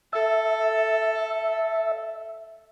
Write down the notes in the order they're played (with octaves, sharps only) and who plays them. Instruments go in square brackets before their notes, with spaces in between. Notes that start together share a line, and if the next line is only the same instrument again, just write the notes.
[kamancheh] A4 [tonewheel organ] E5